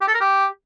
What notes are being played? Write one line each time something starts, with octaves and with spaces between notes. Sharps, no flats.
G4
A4
A#4
G4